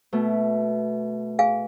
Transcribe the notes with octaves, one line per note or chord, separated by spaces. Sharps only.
B2 A3
G#4 F5 G#5